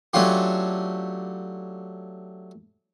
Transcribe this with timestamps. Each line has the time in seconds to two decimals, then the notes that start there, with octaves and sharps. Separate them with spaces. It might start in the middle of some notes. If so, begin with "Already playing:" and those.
0.13 F#3 A3 C#4 D4 F4 G4